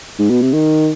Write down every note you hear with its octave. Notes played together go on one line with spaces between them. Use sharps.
G#2
B2
C3
D#3